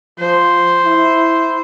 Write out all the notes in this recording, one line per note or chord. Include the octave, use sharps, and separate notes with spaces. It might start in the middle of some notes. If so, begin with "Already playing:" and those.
F3 C5
E4